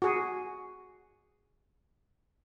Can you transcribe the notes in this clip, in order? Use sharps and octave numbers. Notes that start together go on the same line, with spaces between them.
F#4 G#4